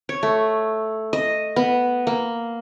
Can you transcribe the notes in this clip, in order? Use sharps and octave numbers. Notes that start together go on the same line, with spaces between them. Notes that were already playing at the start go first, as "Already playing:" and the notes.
C#5
A3
D#5
B3
A#3